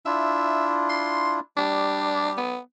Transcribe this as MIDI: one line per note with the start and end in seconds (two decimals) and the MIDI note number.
0.06 1.40 62
0.06 1.40 64
0.06 1.40 65
0.06 0.75 76
0.89 1.32 84
1.57 2.40 55
1.57 2.30 62
1.57 2.40 67
2.37 2.60 59